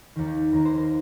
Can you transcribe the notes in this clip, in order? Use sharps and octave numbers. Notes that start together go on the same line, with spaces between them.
D#2 D#3
D#2 D#3 A#4
C5
A#4